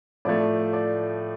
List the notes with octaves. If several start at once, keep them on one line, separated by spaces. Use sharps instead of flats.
A2 F3 A3 D5
D5